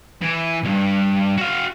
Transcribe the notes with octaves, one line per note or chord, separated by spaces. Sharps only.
E3
B1 G2
F#4 F5